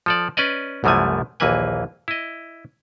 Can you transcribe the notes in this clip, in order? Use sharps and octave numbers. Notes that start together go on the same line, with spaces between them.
F3 A4 D5
C#4 B4 D5 D#5
C2 F#2 E3 F3 A3 G#5
A#1 D#2 E3 A#3 B4 G#5
E4 D#5